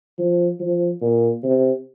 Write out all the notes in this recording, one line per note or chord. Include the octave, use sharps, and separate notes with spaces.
F3
F3
A#2
C3